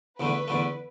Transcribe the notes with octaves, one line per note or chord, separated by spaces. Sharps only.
E2 D3 A3 B4
E2 D3 A3